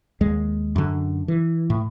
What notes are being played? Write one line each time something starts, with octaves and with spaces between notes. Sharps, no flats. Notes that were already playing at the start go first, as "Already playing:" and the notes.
D#2 G#3
F#2 D3
E3
A2